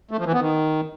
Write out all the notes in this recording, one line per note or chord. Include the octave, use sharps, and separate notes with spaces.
A3
F3
E3
B3
D#3